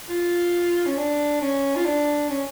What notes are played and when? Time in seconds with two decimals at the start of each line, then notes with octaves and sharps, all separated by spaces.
0.09 F4
0.86 C#4
0.97 D4
1.41 C#4
1.76 F4
1.85 D4
2.29 C#4